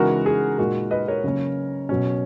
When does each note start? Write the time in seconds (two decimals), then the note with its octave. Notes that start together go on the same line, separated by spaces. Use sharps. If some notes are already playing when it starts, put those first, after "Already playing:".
Already playing: C#3 E3 G#3 D#4 F#4 A#4
0.26 G#4
0.58 A#2 G#3 D#4 F#4 A#4
0.91 B4 D#5
1.08 A#4 C#5
1.24 C#3 F#3 A#3 C#4
1.89 B2 F#3 C#4